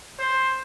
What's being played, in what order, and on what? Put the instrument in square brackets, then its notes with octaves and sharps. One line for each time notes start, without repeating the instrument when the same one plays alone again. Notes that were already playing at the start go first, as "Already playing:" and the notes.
[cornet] C5